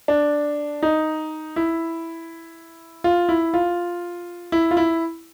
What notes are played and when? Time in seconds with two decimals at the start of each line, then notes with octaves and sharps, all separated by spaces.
0.08 D4
0.83 D#4
1.56 E4
3.04 F4
3.29 E4
3.54 F4
4.52 E4
4.71 F4
4.77 E4